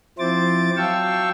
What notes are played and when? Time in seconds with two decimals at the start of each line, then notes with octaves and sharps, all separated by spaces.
0.19 F3 C4 E4 C5 D6 A6
0.77 F#3 F5 G5 A5 C#6 E6